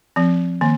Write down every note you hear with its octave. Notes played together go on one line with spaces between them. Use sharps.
F3 C4
D#3 A#3